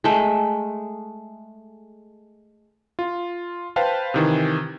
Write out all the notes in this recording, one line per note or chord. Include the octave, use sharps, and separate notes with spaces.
G#3 A3
F4
B4 C5 F5 G5 A5
C3 D#3 E3